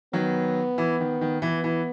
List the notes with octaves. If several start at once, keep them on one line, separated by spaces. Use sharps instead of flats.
D#3 F#3 B3
E3
D#3
D#3
E3 B3
E3